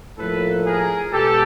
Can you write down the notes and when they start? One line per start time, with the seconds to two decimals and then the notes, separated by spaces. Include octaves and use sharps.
0.17 A2 F3 A#3 A4 B4
0.65 G#4 A#4
1.12 B2 G#3 G4 A4